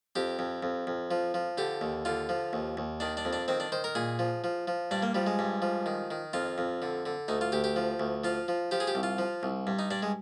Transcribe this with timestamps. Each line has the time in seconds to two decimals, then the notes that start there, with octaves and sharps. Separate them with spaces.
0.16 F2 G4
0.39 F2
0.63 F2
0.87 F2
1.11 F3
1.34 F3
1.58 D3 G4
1.81 D#2
2.05 D3 F4
2.29 F3
2.53 D#2
2.77 D#2
3.00 D#3 D4
3.17 D4
3.25 F2
3.33 D4
3.48 D#3 C4
3.60 D4
3.72 D#3 C5
3.84 A#4
3.95 A#2 G#4
4.19 F3
4.44 F3
4.68 F3
4.91 G2 D4
5.03 A#3
5.15 F3 G3
5.26 G#3
5.39 G2
5.62 F3
5.86 D#3
6.11 D#3
6.33 F2 F4
6.58 F2
6.82 D3
7.06 D3
7.28 D2 D#4
7.41 F4
7.52 D2 G4
7.64 G4
7.76 F3
8.00 D2
8.24 F3 F4
8.48 F3
8.71 F3 G4
8.80 G#4
8.87 G4
8.95 C2
9.03 F4
9.18 F3
9.43 C2
9.67 G2
9.79 D#4
9.91 G2 D4
10.03 G#3